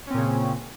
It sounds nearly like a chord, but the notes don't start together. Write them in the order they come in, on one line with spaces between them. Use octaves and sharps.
C#4 C4 A#2 C#3